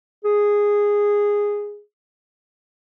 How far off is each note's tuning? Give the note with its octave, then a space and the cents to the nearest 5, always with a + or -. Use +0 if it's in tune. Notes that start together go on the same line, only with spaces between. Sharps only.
G#4 -10